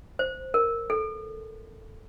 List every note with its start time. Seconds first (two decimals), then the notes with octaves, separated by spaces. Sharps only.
0.19 C5
0.54 A#4
0.90 A4